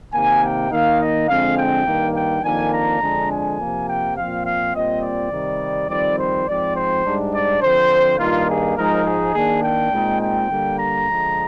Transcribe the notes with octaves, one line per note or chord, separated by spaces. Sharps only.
C3 D#3 A#3 G#5
G5
D#3 A#3 D#4 F5
D#5
F2 D3 G#3 C4 F5
G5
G2 D#3 A#3
G5
F2 D#3 A#3 D4 G#5
A#5
F2 D3 G#3 D4
G#5
C3 F3 A#3
G5
A#2 F3 C4 F5
F5
A#2 G3 C4 D#5
D5
C3 D#3 G3
F2 D#3 G3 C4 D5
C5
G#2 F3 C4 D5
C5
G#2 G3 D4
D5
D3 F3 C4 C5
G2 D#3 A#3 D#4 F4
G#4
G#2 F3 G#3 D#4 A#4
G#4
D#3 A#3 D4 G#4
G5
A#2 G#3 C4 D#4
G5
D3 G3 A#3
A#5
D3 F3 G#3